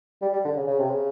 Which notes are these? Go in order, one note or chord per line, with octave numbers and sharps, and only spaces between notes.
G3
G3
D3
C#3
C#3
C3
C#3